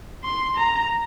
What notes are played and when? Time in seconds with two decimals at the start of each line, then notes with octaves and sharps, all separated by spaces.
0.24 C6
0.57 A#5